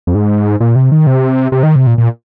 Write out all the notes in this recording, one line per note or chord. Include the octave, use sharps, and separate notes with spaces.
F2
G#2
A#2
C3
D#3
C3
C3
D#3
C3
A#2
A#2